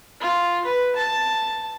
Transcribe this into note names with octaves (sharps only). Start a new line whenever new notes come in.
F4
B4
A5